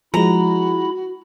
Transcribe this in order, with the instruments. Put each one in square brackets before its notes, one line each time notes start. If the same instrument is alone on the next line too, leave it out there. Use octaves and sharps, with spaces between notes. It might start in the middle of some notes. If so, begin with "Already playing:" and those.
[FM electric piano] F3 G#3 [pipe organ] E4 B5 [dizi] F#4 [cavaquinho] A#5